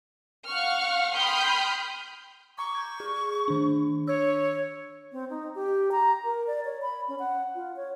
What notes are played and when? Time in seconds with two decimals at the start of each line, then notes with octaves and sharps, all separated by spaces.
0.47 F5 F#5 C#6 F6
1.14 G5 B5 C6 D#6 F6 G6
2.58 A#5 C#6 D6
2.75 G6 G#6
3.00 G#4
3.48 D#3 D4
4.07 C#5 E6 G#6
5.12 C4
5.30 D#4
5.55 G4
5.92 A#5
6.25 A#4
6.47 D5
6.65 C#5
6.82 B5
7.08 C#4
7.19 F#5
7.55 F4
7.76 C#5